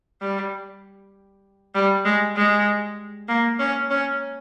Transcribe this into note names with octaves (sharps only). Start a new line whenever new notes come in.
G3
G3
G#3
G#3
A#3
C#4
C#4